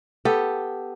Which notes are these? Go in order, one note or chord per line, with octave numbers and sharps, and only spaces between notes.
B3 G4 A4